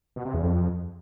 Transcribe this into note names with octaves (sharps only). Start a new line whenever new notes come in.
B2
C3
E2
F2